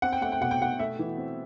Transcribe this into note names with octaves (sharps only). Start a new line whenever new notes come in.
C4 F#5
G5
A3 F#5
G5
B2 F#5
G5
B2 F#5
A3 E5
E3
C4